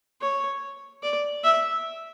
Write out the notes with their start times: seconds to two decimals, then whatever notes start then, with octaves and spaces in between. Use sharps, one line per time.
0.21 C#5
1.03 D5
1.43 E5